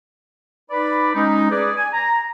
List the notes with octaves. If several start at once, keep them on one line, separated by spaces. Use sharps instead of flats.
D#4 B4 D5 B5
G#3 C#4 D#4
G#4 B4 D5
G#5
A#5